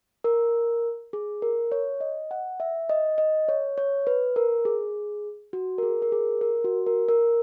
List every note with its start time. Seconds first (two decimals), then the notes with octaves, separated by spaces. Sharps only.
0.24 A#4
1.13 G#4
1.42 A#4
1.72 C#5
2.01 D#5
2.31 F#5
2.60 E5
2.90 D#5
3.18 D#5
3.49 C#5
3.78 C#5
4.07 B4
4.36 A#4
4.65 G#4
5.53 F#4
5.78 A#4
5.83 G#4
6.02 A#4
6.12 G#4
6.41 A#4
6.64 F#4
6.86 A#4
7.09 A#4